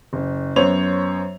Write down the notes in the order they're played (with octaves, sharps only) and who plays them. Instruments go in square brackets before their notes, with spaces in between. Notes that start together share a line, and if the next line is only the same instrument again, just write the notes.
[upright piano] F#1
F#2 B3 C5 C#5 F7